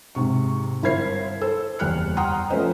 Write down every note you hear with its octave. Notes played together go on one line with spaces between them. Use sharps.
G#2 C3 C#6
G1 E4 A#4 C5 G#6 C7
A4 C5 E6
F#1 E2 G3 F6 F#6 C#7
F#5 G5 A#5 C6 D#6 F6
F3 A3 C#4 B4 C5 D#5